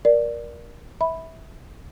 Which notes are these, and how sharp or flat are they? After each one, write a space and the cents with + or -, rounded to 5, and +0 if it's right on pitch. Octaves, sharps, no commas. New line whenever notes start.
A#4 +20 D5 +0
E5 -20 B5 +0